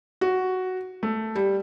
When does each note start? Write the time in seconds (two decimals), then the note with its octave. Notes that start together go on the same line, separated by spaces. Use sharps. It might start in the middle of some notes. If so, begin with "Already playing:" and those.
0.21 F#4
1.03 A3
1.36 G3